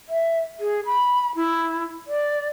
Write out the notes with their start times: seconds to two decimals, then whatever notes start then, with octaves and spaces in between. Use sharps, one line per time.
0.09 E5
0.60 G#4
0.85 B5
1.36 E4
2.07 D5